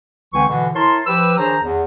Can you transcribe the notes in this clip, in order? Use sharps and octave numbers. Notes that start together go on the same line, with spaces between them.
C#2 D3 E3 C4 G#5 C#6
B2 D3 E3
E4 A#4 C#5 A5 C6
F3 G4 B4 E6
D#3 D4 G#4 C5 C#5 A#5
E2